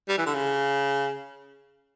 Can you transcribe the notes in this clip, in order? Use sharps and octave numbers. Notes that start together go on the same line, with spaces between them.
G3
E3
D3
C#3